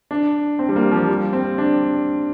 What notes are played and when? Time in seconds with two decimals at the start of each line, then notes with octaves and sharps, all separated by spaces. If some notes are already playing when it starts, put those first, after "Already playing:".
0.11 D4
0.59 C4
0.69 G3
0.76 A#3
0.91 F3
1.09 G3
1.33 C4
1.58 D4